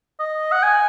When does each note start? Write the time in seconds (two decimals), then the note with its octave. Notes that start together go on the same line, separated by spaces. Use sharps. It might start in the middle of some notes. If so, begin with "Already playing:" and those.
0.20 D#5
0.52 F#5
0.63 G#5